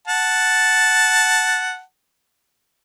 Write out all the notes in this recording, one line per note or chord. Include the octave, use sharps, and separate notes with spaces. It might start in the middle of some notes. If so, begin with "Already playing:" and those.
F#5 A5